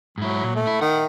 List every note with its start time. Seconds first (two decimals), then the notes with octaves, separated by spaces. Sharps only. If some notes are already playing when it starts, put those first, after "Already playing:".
0.18 G#2 F#3 E4
0.44 A#2
0.56 A3
0.67 E4
0.81 D#3 F#5